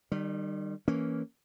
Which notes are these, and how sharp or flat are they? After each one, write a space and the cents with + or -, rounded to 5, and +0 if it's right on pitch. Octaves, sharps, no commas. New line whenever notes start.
D#3 -35 G3 +0
E3 +0 A#3 -5 C#4 +0